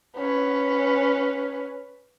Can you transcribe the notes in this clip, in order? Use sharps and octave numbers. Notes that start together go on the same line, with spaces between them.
C#4 B4